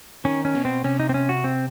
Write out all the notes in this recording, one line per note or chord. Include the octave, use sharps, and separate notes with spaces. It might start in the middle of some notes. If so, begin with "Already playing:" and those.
D#3 C#4
C#4
B2
C4
C3 C#4
D#4
C4
C#4
F#4
C4